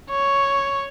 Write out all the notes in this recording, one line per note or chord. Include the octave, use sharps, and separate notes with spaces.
C#5